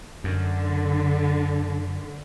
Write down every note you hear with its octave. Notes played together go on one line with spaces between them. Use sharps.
F#2 D3